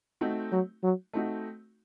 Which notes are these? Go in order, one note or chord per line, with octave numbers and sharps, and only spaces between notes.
A3 C4 D#4 F#4
F#3
F#3
A3 C4 D#4 F#4